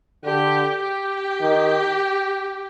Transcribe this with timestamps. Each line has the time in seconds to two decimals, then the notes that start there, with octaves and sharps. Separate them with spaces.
0.24 D3 G4
0.82 G4
1.41 D#3